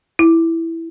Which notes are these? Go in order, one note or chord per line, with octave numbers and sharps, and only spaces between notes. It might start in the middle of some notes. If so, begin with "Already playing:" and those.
E4